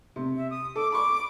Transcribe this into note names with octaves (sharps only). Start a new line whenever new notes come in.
C3
E5
D#6
A4 D6
B5 C#6 D6